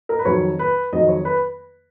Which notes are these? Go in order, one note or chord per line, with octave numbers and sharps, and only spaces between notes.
A#4
B4
F2 D#3 F#3 C#5
B4
F2 D#3 F#3 D#5
C#5
B4